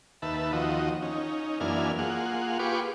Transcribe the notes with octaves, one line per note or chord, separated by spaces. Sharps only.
D#2 B4 E5 A5
D#2 F3 F#4 D#5
C#4 D#4
F#2 E3 A#3 D4 G#5 F6
A#3 F4 G#4 F#5
F4 G4 G#4 B4 C#6 D6